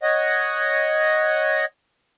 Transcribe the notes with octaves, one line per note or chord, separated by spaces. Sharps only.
C#5 D#5 F#5